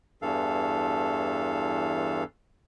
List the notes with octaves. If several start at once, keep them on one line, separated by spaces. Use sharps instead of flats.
E2 G2 E3 A4 F5